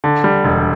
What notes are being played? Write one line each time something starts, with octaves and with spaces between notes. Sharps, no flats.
D3
G3
E1